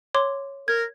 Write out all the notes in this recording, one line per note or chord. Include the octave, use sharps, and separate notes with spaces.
C#5 C6 D6
A#4 G#6